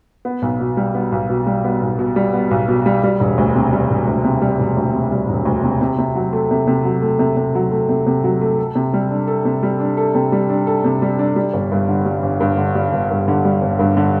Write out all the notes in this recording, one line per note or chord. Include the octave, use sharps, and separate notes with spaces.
B3
B1
B2
G3
B3
B1
B2
G3
B3
B1
B2
G3
B3
B1
B2
G3
G3
E1
D2
C3
G3
E1
D2
C3
G3
E1
D2
C3
G3
E1
D2
C3
C3
C3
F#3
A3
C3
C3
F#3
A3
C3
C3
F#3
A3
C3
C3
F#3
A3
A4
C3
G3
D4
A4
C3
G3
D4
A4
C3
G3
D4
A4
C3
G3
D4
G3
G1
G2
D3
G3
G1
G2
D3
G3
G1
G2
D3
G3
G1
G2
D3